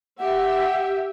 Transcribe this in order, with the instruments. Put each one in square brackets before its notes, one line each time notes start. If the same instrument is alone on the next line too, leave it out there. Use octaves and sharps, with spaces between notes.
[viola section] G4 E5 [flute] F#5